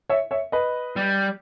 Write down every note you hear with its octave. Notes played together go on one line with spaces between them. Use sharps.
C#5 E5
C#5 E5
B4 D#5
G3